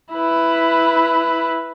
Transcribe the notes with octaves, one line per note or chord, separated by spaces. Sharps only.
E4 B4